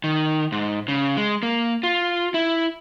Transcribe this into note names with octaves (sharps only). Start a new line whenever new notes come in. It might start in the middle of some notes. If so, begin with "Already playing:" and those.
D#3
G#2
C#3
G#3
A#3
F4
E4